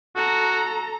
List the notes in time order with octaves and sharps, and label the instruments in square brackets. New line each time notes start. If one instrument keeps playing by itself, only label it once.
[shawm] F#4 [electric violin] A4 A#5